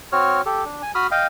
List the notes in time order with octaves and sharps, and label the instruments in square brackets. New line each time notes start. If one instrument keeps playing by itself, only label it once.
[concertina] C4 F#4 C#5 F6
G4 A4
D4
G#5
F#4 B5 D#6 F6
D#5 F5 G5